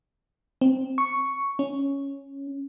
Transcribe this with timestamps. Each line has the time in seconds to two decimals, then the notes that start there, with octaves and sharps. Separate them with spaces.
0.61 C4
0.98 C#6
1.59 C#4